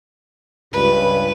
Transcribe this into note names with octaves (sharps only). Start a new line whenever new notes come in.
C#2 G2 B4